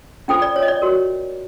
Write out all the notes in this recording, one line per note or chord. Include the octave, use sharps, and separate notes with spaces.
C#4 F4 A4 C5 G5
D5
C#5
D#5
D5
F#4 A#4 C#5